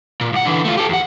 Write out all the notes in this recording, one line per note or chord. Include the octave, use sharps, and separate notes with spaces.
A#2
C2 F#5
D3 E3
A3 F4
G4 A4
E2 F#5